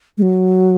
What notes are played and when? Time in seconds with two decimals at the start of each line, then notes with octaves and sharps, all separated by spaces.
0.18 G#3
0.22 F#3